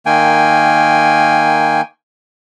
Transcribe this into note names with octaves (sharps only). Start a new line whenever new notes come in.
D#3 A#3 G5 G#5